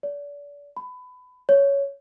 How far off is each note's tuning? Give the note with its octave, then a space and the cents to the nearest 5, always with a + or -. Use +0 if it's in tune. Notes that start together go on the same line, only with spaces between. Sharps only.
D5 -35
B5 +20
C#5 +10